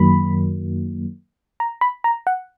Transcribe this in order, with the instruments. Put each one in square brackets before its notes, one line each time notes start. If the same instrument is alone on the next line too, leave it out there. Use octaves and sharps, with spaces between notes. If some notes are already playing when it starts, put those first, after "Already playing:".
Already playing: [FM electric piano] F#2 D#3 F#3 A#3 B5
A#5
B5
A#5
F#5